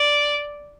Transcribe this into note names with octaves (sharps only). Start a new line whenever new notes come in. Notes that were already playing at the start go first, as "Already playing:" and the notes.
Already playing: D5